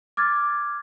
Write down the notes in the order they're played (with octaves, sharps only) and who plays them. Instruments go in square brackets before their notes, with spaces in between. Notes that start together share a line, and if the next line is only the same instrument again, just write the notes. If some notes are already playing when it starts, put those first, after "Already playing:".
[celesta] D6 F6 G#6 A6